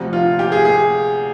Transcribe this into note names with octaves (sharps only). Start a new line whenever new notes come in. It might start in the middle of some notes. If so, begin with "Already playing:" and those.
Already playing: D2 C3 F3
F4
G4
G#4
G#4